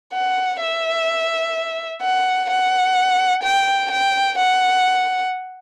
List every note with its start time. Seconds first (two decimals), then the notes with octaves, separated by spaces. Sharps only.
0.13 F#5
0.61 E5
2.02 F#5
2.50 F#5
3.43 G5
3.90 G5
4.38 F#5